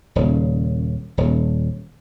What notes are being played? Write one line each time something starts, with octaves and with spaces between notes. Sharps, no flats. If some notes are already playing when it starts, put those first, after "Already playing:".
D#1 C#3
D#1